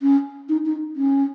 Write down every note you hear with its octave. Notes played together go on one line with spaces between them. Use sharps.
C#4
D#4
D#4
C#4